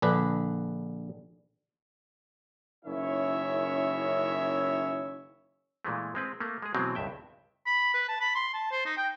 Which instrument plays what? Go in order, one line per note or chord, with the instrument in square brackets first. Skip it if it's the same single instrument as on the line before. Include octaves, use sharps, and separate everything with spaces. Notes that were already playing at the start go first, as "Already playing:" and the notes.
[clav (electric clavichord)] A#1 D3 D4 B4
[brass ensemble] F#1 D#3 C#4 E4 C#5 E5
[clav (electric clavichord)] A#2 E3 G#3 A3
G#3 C4 B4
A3 A#3
G#3 G#4
B2 E3 F#3 G#3 C4
C#2 G2 E5 G5
[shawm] B5
B4
A5
B5
C6
A5
C5
D#4
G5